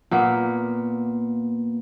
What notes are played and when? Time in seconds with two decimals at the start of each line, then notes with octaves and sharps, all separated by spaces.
0.11 A#2 A#3 B3